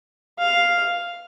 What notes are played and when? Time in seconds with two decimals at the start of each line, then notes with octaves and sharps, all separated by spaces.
0.39 F5